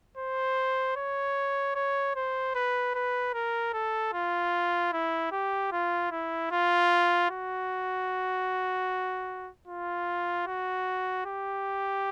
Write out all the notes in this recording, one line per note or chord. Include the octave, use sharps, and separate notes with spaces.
C5
C#5
C#5
C5
B4
B4
A#4
A4
F4
E4
G4
F4
E4
F4
F#4
F4
F#4
G4